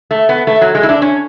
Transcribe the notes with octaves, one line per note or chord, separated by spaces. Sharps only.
A3
B3
A3
F#3
G#3
E4
D4
C#4